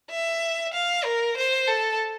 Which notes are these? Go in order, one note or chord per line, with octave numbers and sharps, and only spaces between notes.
E5
F5
A#4
C5
A4